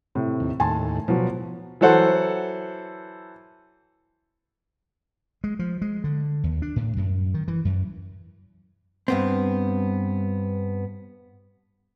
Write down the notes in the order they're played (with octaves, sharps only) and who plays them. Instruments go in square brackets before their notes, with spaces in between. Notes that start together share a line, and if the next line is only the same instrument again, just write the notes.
[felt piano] A2 C3
[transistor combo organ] D#2
[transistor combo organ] D#2 A2 [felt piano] G#5 A5 C6
[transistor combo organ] B2 [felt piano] F3 F#3
[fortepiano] E3 F#3 A4 C5 F#5
[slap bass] G#3
F3
G#3
D3
D#2
D4
A2
F#2
D#3
E3
F#2
[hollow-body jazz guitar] G2 B3 C4